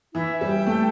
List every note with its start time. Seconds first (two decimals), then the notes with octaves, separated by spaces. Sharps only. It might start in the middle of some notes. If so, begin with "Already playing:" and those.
0.15 E3 E4
0.32 E5
0.41 G3
0.49 G5
0.66 A3 A4